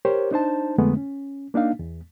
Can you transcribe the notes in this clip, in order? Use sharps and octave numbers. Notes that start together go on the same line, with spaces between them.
G4 A#4 C5 C#5
D4 D#4 C5 A5
F2 D3 G#3 A3 B3
C#4
A#3 D4 D#4 F5
E2